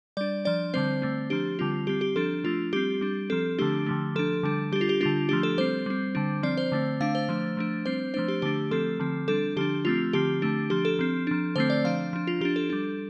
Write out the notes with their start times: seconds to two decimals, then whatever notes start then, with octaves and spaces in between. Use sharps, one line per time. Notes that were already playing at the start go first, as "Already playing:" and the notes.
0.17 G3 D4 D5
0.45 F3 D4 D5
0.74 D3 G3 C4 C5
1.02 D3 A3 C4
1.30 F3 D4 G4
1.59 D3 G3 C4 F4
1.87 G3 C4 G4
2.01 G4
2.16 F3 D4 A4
2.44 F3 A3 D4 F4
2.73 G3 C4 G4
3.01 G3 D4
3.30 F3 C4 A4
3.58 D3 F3 A3 D4 G4
3.86 D3 F3 A3
4.15 F3 D4 A4
4.43 D3 G3 D4
4.72 G3 D4 G4
4.81 F4
4.89 G4
5.01 D3 G3 D4 F4
5.29 F3 A3 D4 G4
5.43 A4
5.58 G3 C4 C5
5.86 G3 C4
6.15 D3 G3 D4
6.43 F3 C4 D5
6.57 C5
6.72 D3 A3 C4
7.00 D3 A3 D4 F5
7.15 C5
7.29 F3 A3 D4
7.57 F3 A3 D4
7.86 G3 C4 C5
8.14 F3 A3 D4 C5
8.28 G4
8.42 D3 A3 D4 G4
8.71 F3 A3 C4 A4
8.99 D3 F3 C4
9.28 G3 D4 A4
9.56 D3 F3 D4 G4
9.85 F3 A3 C4 F4
10.13 D3 F3 C4 G4
10.42 D3 A3 D4
10.70 F3 D4 G4
10.85 A4
10.99 F3 C4
11.27 F3 D4
11.56 D3 A3 C4 C5
11.70 D5
11.84 F3 D4 F5
12.13 F3 D4
12.27 F4
12.41 F3 D4 G4
12.56 A4
12.70 G3 D4